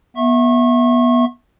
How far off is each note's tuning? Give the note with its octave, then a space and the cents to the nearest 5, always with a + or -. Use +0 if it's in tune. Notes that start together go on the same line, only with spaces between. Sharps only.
B3 -25 E5 +0 C#6 -35